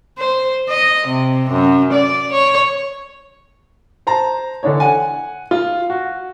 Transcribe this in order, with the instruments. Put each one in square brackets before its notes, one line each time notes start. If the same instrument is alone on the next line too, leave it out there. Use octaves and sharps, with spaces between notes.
[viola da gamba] C5
D#5
C3
F#2
D5
C#5
[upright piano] C5 A5 A#5
D3 E3 D4 D#4 C#5
F#5 G#5
F4
F#4